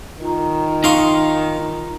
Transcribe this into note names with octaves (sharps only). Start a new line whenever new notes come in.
D#3 F4 A#5
D#4 F5 C6 C#6 D#6